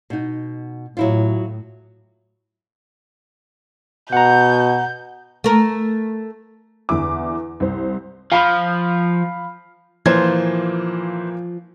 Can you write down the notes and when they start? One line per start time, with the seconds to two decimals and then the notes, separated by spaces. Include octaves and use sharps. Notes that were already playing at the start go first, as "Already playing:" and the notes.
0.10 B2 D#4
0.97 A2 F#3 E4 F4
4.13 B2 F#5 A#5 G6
5.44 A3 A#4
6.89 E2 D3 E4 D6
7.60 C2 C5
8.32 F3 F5 B5 F6
10.06 A#2 E3 F3 A#3 C5 G#6